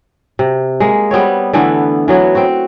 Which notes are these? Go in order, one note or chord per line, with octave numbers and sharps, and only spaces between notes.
C3
G#3 A#3
G3 B3 C4 C#5
D3 E3 A3 B3
E3 F#3 B3
C4 F#4